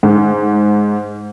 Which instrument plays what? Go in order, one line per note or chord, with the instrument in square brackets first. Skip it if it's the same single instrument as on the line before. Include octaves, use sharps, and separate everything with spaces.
[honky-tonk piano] G#2